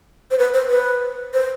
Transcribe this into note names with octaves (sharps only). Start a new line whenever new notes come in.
C5
B4
C5
B4
C5